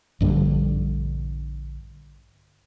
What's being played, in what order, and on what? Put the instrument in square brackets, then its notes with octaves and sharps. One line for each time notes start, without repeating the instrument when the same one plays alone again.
[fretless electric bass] A#1 G2 D3 G3